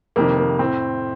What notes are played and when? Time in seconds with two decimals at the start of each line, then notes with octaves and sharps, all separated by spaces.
0.16 F2 C3 D#3 A#3
0.38 A#3
0.59 A2 C4